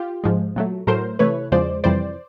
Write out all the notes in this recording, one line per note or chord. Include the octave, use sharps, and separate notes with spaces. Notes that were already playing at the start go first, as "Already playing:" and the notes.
Already playing: F4 G4
G#2 F3 G#3
A#2 F#3 A3
A2 F#3 A3 A#4 C5
C3 E3 A3 B4 C#5
E2 C#3 F3 G#3 C5 D5
F2 C3 E3 G3 C5 D5